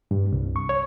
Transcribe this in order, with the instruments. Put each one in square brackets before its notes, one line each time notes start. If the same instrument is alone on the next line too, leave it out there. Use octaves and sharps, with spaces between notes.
[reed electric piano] G2
C2
C#6
C#5